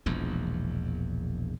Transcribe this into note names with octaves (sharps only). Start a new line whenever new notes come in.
E1 A#1 E2